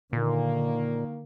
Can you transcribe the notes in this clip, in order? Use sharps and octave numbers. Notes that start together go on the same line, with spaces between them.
A#2 D3 D#3 A#3